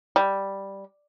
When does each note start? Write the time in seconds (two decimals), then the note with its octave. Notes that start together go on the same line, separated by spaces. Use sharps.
0.16 G3